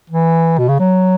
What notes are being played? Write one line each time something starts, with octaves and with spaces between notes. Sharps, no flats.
E3
B2
C#3
F#3